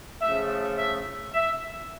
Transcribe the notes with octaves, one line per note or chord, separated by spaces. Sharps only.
C#3 F3 A3 E5
E5
E5